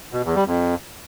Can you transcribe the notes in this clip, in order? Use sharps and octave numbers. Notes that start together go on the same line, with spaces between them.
B2
E2
G3
F2